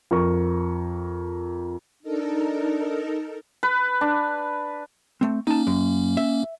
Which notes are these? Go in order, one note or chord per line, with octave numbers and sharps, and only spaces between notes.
F2 A#4 C#6
D4 D#4 A4 A#4
B4
D4
A3 C4
A#3 C#4 D#4 A5
F#2
E5